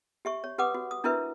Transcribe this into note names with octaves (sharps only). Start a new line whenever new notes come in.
G4 E5 C#6
C#5
G4 B4 F#5 D6 D#6
F#4
D#6
D4 E4 F#4 A#4 B4 E5